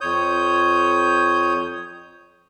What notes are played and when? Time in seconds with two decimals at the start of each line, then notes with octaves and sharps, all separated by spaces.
0.01 F2 C#5 D#6 G6